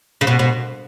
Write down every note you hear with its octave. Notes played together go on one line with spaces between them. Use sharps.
C#3
B2
B2